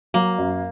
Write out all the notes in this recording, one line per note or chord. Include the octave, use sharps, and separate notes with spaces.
F#3 A#3
F#2